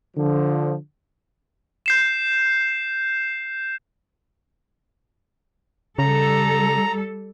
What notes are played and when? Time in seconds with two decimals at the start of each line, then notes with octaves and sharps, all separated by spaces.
0.17 D3 F3
1.86 G6 C7 E7
5.98 C#3 G3 A4 A#5